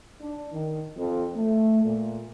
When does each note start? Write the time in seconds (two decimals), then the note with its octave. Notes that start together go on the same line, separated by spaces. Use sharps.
0.20 D4
0.52 D#3
0.97 F2
1.34 A3
1.86 A#2